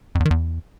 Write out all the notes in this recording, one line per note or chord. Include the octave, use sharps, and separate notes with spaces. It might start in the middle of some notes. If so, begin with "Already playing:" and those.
F2
E2
D#3
E2